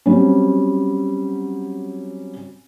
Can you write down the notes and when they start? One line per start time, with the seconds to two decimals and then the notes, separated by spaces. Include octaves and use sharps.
0.06 F#3 G3 C4 C#4